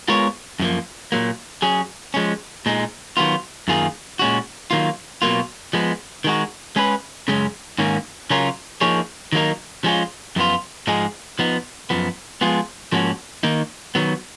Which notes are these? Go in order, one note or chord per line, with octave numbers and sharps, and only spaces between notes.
G#3 B3 F4 A#4 C#5
F#2 F3 A#3
A#2 F#3 A#3
F#3 C#4 G#4
F3 G#3 C#4
A#2 G#3 D#4
D#3 F#3 B3 F4
F#2 D#3 A#3 F4 G#4
A#2 G#3 C#4 F#4
D#3 F#3 A#3 F4
B2 F#3 A#3 F4
F3 G#3 B3
D#3 G#3 D#4 F#4
G#3 C#4 G#4 B4
F#2 C#3 G#3 C#4
G#2 D#3 A#3 C#4
C#3 F#3 C#4 F4 A#4
F3 A#3 D#4 G#4 C#5
D#3 F#3 A#3 D#4 A#4
F3 G#3 C#4 F4
F#2 F3 B3 F4
G#2 F3 G#3 D#4 G#4
F3 B3 D#4
F#2 F3 B3
F3 G#3 B3 F4 G#4
G#2 F3 A#3 C#4 F#4
D#3 A#3 D#4
D#3 F#3 B3